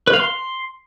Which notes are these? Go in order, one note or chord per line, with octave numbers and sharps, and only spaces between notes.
B4
F5
C6